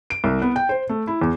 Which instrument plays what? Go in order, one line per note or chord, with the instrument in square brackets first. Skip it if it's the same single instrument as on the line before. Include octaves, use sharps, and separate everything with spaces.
[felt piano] D7
C2
B3
G5
C5
A3
E4
E2